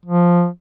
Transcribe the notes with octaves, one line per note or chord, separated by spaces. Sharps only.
F3